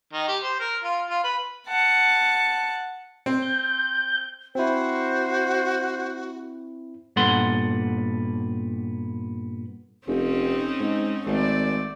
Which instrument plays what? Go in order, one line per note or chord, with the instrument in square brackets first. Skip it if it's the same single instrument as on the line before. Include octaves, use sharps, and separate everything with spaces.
[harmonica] D#3
G4
C5
A#4
F4
F4
B4
[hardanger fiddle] F#5 A5
[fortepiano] C4
[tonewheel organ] G6
[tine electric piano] C4 E4 [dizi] F#4 [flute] C5
[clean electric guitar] G2 A#2 B3 A4 F#5 C6
[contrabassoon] F1 [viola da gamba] C4 C#4 D#4
[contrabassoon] G#2
[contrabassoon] G#1 [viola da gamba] A3 C4 D5